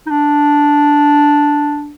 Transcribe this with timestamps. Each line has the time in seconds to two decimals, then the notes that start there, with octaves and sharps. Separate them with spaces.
0.06 D#4
0.11 D4